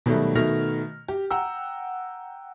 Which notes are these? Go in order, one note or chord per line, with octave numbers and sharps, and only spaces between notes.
B2 D#3 F#3 G3 A3
B2 D#3 A3 F6 A#6 F7
G4
F#5 G5 A#5 E6